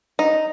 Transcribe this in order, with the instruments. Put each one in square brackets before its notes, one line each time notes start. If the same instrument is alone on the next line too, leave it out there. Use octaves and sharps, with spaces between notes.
[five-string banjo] D#4